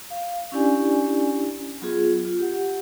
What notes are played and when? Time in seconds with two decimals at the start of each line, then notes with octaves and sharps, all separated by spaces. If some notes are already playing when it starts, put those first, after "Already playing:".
0.10 F5
0.52 C#4 D4 E4 G4 D5 G#5
1.82 F#3 B3 F4 G#4
2.25 F4
2.39 G4 F#5